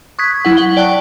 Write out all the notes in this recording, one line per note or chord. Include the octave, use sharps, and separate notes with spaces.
C#6 D#6 F#6 G#6 B6
F#3 E4 F#5
F#5 G7
D5 G5 A5 C#6 F#6